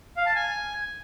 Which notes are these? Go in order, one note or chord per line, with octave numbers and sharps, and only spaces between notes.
F5
A5
G#5